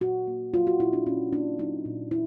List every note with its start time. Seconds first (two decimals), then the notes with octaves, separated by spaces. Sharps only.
0.01 A#2 F#4
0.27 A#3
0.54 F#3 F4
0.67 F#4
0.80 A#2 E4
0.93 D4
1.06 A#2 C#4
1.33 A#3 D4
1.59 F#3 D#4
1.85 A#2
2.11 E4